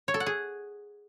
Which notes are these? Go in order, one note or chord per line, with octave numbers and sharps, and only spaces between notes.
C#5
A4
F#5
G#4